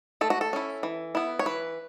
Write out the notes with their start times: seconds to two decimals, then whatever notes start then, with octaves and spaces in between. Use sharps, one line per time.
0.21 A3 A4
0.30 F#4
0.41 A4
0.53 C#4 E4
0.83 E3
1.15 B3 E4
1.39 C#5
1.46 E3 B4